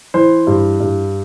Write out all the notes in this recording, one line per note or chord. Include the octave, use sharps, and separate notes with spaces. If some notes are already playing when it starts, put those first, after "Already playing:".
E3 C5
G2
G2